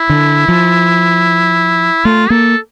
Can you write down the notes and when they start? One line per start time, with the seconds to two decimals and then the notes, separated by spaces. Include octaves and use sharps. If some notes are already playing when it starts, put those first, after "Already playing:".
Already playing: E4
0.10 D3
0.48 F3
2.05 A3 F4
2.30 A#3 A4